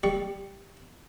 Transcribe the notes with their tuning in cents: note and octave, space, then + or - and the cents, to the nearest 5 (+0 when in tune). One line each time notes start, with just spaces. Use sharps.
G3 +0 C#6 +20